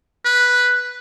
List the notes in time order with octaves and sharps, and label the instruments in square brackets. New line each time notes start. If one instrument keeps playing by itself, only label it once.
[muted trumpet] B4